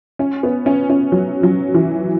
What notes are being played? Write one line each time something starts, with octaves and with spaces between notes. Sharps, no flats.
C#4
B3
C#4
C#4
F#3
F#3
E3